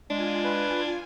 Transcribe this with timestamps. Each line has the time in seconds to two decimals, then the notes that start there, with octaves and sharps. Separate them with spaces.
0.10 G#3 D4 F4 G#5
0.44 B4